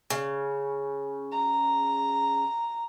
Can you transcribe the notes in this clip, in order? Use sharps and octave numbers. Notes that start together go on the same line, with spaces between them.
C#3
A#5